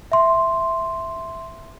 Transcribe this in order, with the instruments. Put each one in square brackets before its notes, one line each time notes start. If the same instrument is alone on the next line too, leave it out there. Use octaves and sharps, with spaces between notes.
[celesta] E5 C6